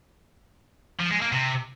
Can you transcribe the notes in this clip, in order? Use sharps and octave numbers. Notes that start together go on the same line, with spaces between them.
F3
G#3
A#3
C3